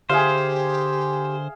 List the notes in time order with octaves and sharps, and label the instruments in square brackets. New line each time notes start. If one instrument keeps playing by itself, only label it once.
[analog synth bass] D3 [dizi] G4 [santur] G#4 E5 F5 [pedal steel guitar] C5